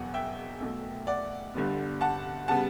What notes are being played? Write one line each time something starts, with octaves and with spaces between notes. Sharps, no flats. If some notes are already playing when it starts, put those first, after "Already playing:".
Already playing: E1 E2 B2 F#3 F#5
E5 G5
B1 B2 A3
D5 F#5
G1 G2 D3 G3 B3
F#5 A5
C#3 G3 B3 F#5 A5